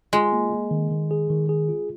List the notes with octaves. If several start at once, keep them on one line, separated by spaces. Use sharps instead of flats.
G#3 F4
A#3
A#3
D#3
D#3
G#4
D#3
G#4
F4